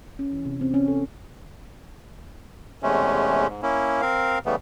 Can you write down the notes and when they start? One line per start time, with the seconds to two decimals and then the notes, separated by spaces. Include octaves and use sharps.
0.19 C#4
0.32 E3
0.45 C3
0.61 C4
0.74 C#4
0.88 A4
2.83 E2 C3 G#3 A3 C#4
3.49 G#2
3.62 A#3 C#4 E4
4.02 C4 A#4 F5
4.46 C#3 E3 G3 A3 B3